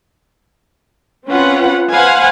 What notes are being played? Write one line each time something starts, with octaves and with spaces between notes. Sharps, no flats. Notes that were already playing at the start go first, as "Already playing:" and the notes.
C4 C#4 F4 B4 F#5
B4 C5 F5 F#5 G#5